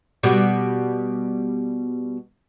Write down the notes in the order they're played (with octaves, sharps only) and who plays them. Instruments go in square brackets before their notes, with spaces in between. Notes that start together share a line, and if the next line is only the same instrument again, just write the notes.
[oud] B2 G3 B3